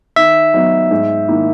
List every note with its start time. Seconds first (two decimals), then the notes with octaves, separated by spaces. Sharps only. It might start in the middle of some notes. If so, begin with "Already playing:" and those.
0.16 D#3 E5
0.54 F#3 B3 D#4
0.91 G#2
1.28 D#3 A#3 E4